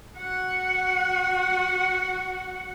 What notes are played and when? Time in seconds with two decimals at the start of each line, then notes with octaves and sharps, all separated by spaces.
0.18 F#4 F#5